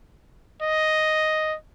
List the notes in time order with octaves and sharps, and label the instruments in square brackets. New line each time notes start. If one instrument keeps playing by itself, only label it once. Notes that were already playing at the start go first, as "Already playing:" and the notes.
[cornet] D#5